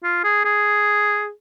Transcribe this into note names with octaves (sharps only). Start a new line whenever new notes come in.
F4
G#4
G#4